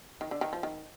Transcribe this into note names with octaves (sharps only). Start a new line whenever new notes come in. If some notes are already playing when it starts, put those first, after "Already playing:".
D#3
D3
D#3
F3
D#3